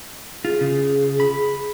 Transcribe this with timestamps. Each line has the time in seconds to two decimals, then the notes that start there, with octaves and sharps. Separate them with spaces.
0.45 F4 G#4
0.59 C#3 F4
1.20 B5